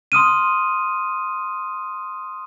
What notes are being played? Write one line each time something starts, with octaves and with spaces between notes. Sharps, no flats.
C6 D#6 F6 D#7